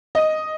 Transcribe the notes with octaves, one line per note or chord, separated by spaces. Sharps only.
D#5